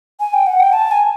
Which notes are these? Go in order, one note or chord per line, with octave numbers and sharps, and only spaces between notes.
G#5
G5
F#5
G5
A5
G#5